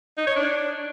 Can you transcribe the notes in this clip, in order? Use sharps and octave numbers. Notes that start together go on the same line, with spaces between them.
D#4
C#5
D4